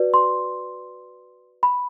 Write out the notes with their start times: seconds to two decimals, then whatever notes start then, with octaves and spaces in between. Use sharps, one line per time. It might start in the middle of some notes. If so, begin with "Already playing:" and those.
Already playing: F#4 B4 D5
0.14 C6
1.63 B5